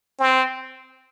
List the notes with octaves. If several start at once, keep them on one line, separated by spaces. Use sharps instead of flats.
C4